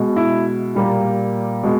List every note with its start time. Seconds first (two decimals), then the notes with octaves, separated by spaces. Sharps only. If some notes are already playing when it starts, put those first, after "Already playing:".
Already playing: B2 G#3
0.16 E4
0.75 A#2 G3 A#3
1.63 B2 G#3